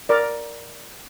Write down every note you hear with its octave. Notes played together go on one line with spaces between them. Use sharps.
A#4 D5